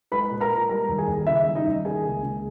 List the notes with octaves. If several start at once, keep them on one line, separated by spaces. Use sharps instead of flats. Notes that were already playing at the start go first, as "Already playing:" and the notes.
G#3 B4 B5
A#2
A#4 A#5
G#3
G3 A#4 A#5
D#2
G#4 G#5
D#2
C#3 E4 E5
G3
D#4 D#5
D#2
A#3 G#4 G#5
C#2
C#2